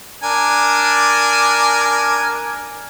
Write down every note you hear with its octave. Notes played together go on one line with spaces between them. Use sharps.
D4 A#4 G#5